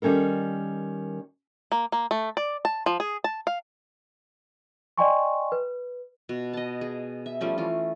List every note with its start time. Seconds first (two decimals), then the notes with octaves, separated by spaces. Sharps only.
0.02 D#3 G3 C#4 A4 A#4
1.72 A#3
1.92 A#3
2.11 A3
2.37 D5
2.65 A5
2.86 F3
3.00 G#4
3.24 A5
3.47 F5
4.98 D5 D#5 G5 G#5 C6 C#6
5.52 B4
6.29 B2
6.53 D#5 A5
6.81 G#4
7.26 E5
7.41 F3 G3 A3 C#4
7.58 E3 F4